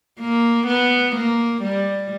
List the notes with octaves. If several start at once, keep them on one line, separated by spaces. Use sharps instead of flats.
A#3
B3
A#3
G3